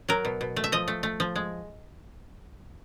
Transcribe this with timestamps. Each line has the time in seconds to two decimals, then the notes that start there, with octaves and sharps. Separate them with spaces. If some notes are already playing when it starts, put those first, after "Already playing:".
0.09 F#3 A#4
0.25 B2
0.41 B2
0.56 A3
0.64 E5
0.72 F3 D#5
0.88 A3
1.03 A3
1.20 F3
1.36 G#3